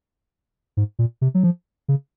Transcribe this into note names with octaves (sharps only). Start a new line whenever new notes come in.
G#2
A#2
C3
F#3
F3
C#3